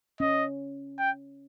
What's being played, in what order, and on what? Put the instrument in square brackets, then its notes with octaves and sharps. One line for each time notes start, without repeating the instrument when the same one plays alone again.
[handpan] C#4 [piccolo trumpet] D#5
[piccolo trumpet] G5